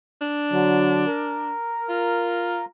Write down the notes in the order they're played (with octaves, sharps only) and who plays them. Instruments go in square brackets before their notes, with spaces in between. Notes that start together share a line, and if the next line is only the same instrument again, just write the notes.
[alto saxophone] D4
[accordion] D3 F#3
A#4
[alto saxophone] F4